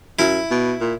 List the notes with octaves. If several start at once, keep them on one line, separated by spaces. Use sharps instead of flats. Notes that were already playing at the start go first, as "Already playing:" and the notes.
F#2 E4
B2
A#2